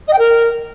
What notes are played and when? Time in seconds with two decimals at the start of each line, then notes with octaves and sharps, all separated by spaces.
0.07 D#5
0.13 G5
0.18 A#4